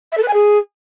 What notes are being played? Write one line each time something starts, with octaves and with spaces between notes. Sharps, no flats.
E5
A4
B4
G#5
G#4